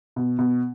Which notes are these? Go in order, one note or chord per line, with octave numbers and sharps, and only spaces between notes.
B2
B2